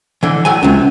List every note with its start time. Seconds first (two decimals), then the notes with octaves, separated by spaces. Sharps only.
0.23 D3 E3
0.45 A2 F#3 G#5
0.63 C#2 C3 F#3